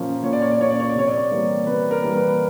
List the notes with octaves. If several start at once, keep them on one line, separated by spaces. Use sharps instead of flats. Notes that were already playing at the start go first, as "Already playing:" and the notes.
Already playing: A#2 F3 A#3 C#4
A#2 C#5
D5
C#5
D5
F3 A#3 C#4 C#5
D5
C#5
D5
C3 C#5
D5
C#5
E3 G3 A#3
C3 B4
A#4
E3 G3 A#3
B4